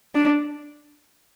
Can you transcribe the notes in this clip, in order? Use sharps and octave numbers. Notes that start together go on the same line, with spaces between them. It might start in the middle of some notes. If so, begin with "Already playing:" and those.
D4